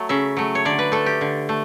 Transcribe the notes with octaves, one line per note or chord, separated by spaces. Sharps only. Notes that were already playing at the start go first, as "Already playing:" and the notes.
Already playing: F#3 A3
C#3 E5
F#3 A3
C#5
D3 D5
B4
A3 A4
G4
D3
A3